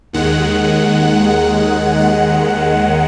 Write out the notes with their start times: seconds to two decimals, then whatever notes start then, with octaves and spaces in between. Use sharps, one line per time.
0.13 D#2 D#3 G#3 F#5
1.98 F#5